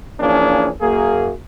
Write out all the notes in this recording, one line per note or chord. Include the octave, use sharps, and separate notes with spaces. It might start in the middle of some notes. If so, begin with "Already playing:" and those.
E3 F3 A#3 C#4 D4 G#4
F#2 A#3 G#4